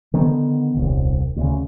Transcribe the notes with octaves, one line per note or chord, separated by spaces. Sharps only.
D3 D#3 B3
D#1 C2
D2 C#3